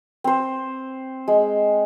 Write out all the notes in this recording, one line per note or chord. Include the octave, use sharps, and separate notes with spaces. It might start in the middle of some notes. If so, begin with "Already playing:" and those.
C4 C5
G#3